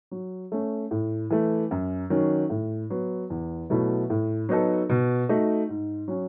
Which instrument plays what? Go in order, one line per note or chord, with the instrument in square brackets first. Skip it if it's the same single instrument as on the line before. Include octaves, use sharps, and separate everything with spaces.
[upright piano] F#3
A3 C#4
A2
E3 A3
F#2
D#3 F#3 C#4
A2
F#3 B3
E2
B2 F#3 A3 E4
A2
F#3 B3 D#4 A4
B2
A3 D#4 F#4
G#2
F#3 C#4